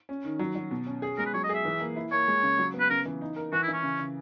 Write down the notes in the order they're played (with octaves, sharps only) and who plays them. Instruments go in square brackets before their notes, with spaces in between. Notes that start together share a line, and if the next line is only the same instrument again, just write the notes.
[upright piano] C#4
D#3
F#3
F#3
B2
C#4
G#4
[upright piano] G#3 [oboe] A#4
[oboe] B4
[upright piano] F#3 [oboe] C#5
[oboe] D#5
[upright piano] G#4 [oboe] E5
[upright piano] E3
A#3
E4
[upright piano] A#3 [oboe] C#5
[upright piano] G#3
C#3
F#3
B3
[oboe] B4
[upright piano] C#3 [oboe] A#4
[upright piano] E3
D#4
A#4
[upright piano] E3 [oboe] F#4
[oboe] E4
[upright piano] E3
[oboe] C#4
[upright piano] C#3
C#3